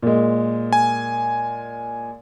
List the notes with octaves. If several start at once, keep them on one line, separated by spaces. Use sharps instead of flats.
A#2 G#3
G#5